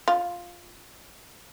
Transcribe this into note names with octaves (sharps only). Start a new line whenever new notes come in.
F4